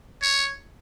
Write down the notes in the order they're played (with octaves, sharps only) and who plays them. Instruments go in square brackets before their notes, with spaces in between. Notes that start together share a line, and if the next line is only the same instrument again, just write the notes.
[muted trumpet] C#5